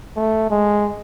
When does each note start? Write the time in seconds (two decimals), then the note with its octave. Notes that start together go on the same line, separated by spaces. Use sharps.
0.16 A3
0.50 G#3